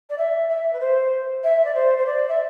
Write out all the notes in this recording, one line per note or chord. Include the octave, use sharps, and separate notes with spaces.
D5
E5
E5
B4
C5
E5
D5
C5
C5
D5
E5